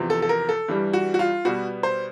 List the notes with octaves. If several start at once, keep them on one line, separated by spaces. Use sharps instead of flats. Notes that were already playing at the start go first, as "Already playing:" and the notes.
Already playing: E2 C3 F3
A4
A4
A#4
A4
G2 E3 G3
F#4
F#4
F4
B2 G3 B3 F#4
C5